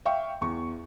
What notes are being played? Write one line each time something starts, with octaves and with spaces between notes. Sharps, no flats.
E5 F5 G5 C#6
E2 C#6